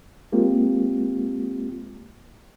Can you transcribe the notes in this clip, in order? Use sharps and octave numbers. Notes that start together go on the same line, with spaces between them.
G#3 A#3 C4 F4 G4